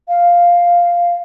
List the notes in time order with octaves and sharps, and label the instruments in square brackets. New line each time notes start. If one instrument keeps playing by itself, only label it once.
[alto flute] F5